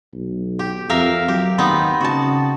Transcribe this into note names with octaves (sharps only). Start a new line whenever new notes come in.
B1
G4
F2 A#4 E5 F5
F#3 G4
D#2 B3 C4 D#4
C#3 F#4 A5